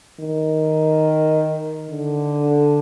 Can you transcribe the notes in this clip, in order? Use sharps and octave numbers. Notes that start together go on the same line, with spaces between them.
D#3
D3